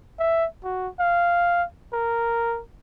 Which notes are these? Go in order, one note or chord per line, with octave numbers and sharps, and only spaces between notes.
E5
F#4
F5
A#4